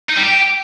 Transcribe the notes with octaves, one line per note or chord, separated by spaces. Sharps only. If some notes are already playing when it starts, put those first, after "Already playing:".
D#4
G3
G4